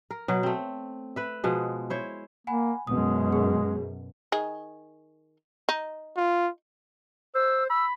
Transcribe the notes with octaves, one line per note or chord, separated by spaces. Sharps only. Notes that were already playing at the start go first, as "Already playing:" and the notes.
A#4
B2 F#3
A3 C4
B4 E5
B2 F3 G#3
E4 C5 C#5
A#3 F#5 G#5 B5
F#2 B2 G#3 D#6
G#4
D#3 G#4
D#4
F4
C5 E6
B5 E6